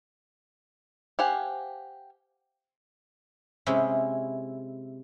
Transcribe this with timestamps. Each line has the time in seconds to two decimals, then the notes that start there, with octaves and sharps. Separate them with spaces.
1.19 G4 C5 F5 F#5 G#5
3.66 C3 G#3 C#4 E4